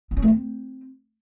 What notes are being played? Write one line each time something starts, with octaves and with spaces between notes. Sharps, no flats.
D4
C#4
A3
C4